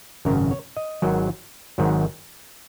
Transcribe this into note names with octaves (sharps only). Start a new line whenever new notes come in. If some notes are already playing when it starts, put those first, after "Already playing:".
G#1 F#2 C#3 A#4
C#5
D#5
G#1 G#2 D#3 F#3
G#1 G#2 D#3 F#3